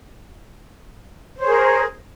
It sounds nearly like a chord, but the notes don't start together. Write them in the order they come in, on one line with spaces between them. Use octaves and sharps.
C5 C#5 G#4 A#4